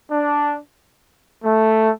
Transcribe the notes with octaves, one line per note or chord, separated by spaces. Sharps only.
D4
A3